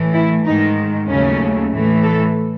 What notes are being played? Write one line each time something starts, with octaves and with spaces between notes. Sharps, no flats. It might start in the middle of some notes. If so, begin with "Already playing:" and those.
Already playing: A2 E3 A3
E4
G#2 D#3 G#3 D#4
D#2 C#3 F#3 A3 C#4
A2 E3 A3
A4